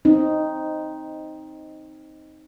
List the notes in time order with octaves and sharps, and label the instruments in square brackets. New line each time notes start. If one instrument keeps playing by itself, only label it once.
[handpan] C4 D#4